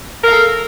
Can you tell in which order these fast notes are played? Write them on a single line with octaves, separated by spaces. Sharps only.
A#4 F5 A4